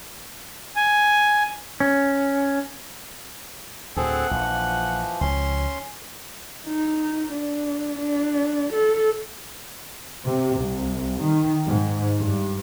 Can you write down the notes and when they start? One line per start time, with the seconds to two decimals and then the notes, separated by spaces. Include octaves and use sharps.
0.76 G#5
1.80 C#4
3.96 D2 A2 C4 G#4 A4 F#5
4.31 A#1 E3 F3
5.21 C#2 F3 C#4 C6
6.67 D#4
7.32 D4
7.99 D4
8.73 A4
10.25 C3
10.58 C2
11.22 D#3
11.66 G#2
12.19 G2